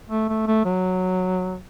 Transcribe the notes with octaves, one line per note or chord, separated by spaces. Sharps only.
A3
A3
A3
F#3